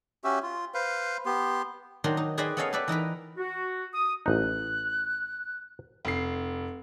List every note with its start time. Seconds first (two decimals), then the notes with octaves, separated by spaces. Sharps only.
0.24 C#4 F#4 G4 E5
0.43 F4
0.74 B4 C5 F5
1.26 B3 G4 C6
2.04 D#3 F#3 D4 C5 C6
2.17 D#4
2.38 G#4 B4 C5 D5 D#5 G5
2.57 B3 C#4 A4 C#5 D#5 F5
2.73 G4 A4 B4 D5 E5
2.88 E3 D#4 A#4 B4
3.38 F#4
3.94 D#6
4.26 A1 D#4 F#6
6.05 F1 C7